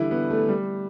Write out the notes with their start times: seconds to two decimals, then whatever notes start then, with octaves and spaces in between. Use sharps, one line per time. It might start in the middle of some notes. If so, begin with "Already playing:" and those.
Already playing: D3 E3 G3 E4
0.11 B3
0.30 A3
0.49 G3